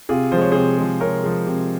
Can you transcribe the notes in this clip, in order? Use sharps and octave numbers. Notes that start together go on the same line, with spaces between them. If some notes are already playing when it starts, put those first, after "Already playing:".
C3 F4 G#4
F3 G#3 C5
C#5
C3 G#4 C5
F3 G#3
C3 A#4 C#5
F3 G#3
C3